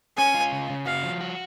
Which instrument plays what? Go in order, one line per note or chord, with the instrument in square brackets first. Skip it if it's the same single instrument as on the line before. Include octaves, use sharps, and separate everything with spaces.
[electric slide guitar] C#4 [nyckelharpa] G#5
[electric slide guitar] F4
C#3
C#3
[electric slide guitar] F#4 [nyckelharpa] F5
[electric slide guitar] F3
F#4